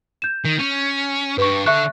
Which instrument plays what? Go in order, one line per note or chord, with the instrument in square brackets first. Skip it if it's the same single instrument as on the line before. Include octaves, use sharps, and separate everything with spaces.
[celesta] G6 E7
[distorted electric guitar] D#3
C#4
[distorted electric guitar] G2 [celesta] B4 C#6
[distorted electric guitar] D3 A4 [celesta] E5 C#6 F#6